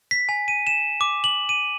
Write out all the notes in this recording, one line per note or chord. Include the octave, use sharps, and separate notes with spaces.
B6
G#5
D#7
E7
D6
F#7
D#7